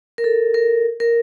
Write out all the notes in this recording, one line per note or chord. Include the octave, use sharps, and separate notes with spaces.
A#4
A4
A#4
A#4